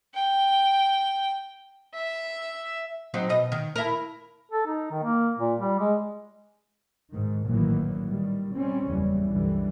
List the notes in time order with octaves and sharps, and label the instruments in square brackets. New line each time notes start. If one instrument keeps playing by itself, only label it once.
[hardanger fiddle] G5
E5
[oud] F#3 C4 D#4
B2 D#5
D#3
E4 A#4
[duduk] A4
D#4
D#3
A#3
A#2
G3
G#3
[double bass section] G#2 D#3
A1 A#2 D#3 E3 F#3 A#3
D#3 G3
G3 C4 C#4
F#1 E2 E3 G3
C2 F#2 D3 E3 G3